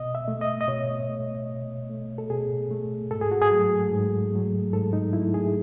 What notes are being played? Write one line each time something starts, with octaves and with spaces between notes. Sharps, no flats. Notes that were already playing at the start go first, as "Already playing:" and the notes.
Already playing: B2 D#5
E5
A3
D#5
D#5
B2 C#5
A3
B2
A3
A4
B2 G#4
A3
G#2 A4
G#4
F#4
G#4
F#3 A3
G#2
F#3 A3
G#2 A4
D#4
F#3 A3 E4
G#4